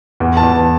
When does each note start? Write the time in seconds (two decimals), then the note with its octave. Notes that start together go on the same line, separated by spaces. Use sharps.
0.20 E2
0.37 A5
0.43 E2